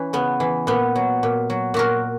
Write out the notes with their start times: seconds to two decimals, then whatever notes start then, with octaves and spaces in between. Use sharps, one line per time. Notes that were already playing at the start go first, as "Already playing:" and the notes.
Already playing: E3 C#4
0.13 C#3 B3
0.40 E3
0.67 A#2 B3
0.96 F#3
1.23 A#2
1.50 F#3
1.74 A#2 F#4 A#4